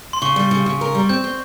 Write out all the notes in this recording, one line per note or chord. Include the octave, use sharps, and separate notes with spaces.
C6
C#3 C#6
G3
C#3
C#3
A#4
G3
C4 G6
C4